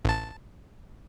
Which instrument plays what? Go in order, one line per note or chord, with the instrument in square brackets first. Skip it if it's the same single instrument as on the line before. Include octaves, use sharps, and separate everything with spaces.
[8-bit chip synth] A1 A5